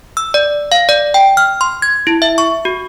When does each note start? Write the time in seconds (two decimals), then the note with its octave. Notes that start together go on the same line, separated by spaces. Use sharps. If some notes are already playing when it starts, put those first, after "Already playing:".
0.17 E6
0.34 D5
0.72 F5
0.89 D5
1.14 G5
1.37 F6
1.61 C6
1.82 G#6
2.07 E4
2.22 E5
2.38 C#6
2.65 F#4